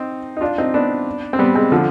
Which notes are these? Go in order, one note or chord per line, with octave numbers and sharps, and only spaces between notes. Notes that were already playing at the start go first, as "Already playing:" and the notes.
Already playing: C4 D#4
D#4
D4 F4
C4 D#4
B3 D4
C4
G3 B3
G#3 C4
D3 F3